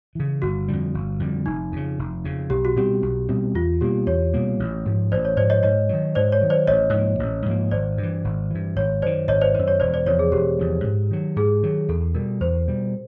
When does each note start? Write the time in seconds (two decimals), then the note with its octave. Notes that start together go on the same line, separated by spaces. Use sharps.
0.15 C#3 E3
0.42 G1 F#4
0.68 F2 D3 G3
0.94 G1
1.20 F2 D3 G3
1.46 F1 D#4
1.72 F2 C#3
1.99 F1
2.24 F2 C#3
2.50 B1 G4
2.65 F#4
2.76 B2 G3 C4 G4
3.02 B1
3.29 B2 G3 C4
3.54 E2 F4
3.81 B2 G3 A#3 G4
4.07 E2 C#5
4.33 B2 G3 A#3
4.60 A1
4.85 G#2 F3
5.12 A1 C5 D5
5.25 C#5
5.37 G#2 F3 C5 D5
5.50 C#5 D#5
5.63 G#2 C#5 D#5
5.89 D#3 F#3
6.15 G#2 C5 D5
6.32 C#5
6.41 D#3 F#3
6.50 C5 D5
6.67 A1 C#5 D#5
6.93 G#2 F3 A#3
7.19 A1
7.46 G#2 F3 A#3
7.71 G#1 C5 D5
7.98 G2
8.03 E3
8.25 G#1
8.51 G2 E3
8.76 G#1 C#5
9.02 F#2 D#3 C5 D5
9.28 G#1 C#5 D#5
9.41 C5 D5
9.54 D#3 C5
9.59 F#2
9.68 C#5
9.80 E1 C5 D5
9.94 C5 D5
10.06 E2 C3 F3 C#5
10.19 G#4
10.32 E1 G4
10.59 E2 C3 F3
10.84 G#2
11.11 D#3 F#3
11.36 G#2 G#4
11.63 D#3 F#3
11.89 E2 A4
12.14 B2 G3 A#4
12.41 E2 C5
12.68 B2 G3